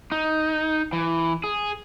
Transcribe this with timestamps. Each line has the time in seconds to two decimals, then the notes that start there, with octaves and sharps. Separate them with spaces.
0.12 D#4
0.93 E3
1.44 G#4